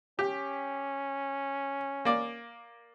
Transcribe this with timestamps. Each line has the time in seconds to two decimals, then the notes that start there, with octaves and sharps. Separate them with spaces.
0.19 C#4 G4
2.05 A#3 D5